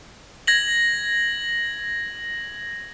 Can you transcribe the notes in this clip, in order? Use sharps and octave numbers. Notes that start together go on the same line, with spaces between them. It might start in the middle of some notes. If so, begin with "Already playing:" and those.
G#6 A#6 F#7